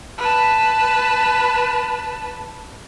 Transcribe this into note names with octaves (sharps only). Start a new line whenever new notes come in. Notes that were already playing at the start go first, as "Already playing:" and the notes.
B4 A5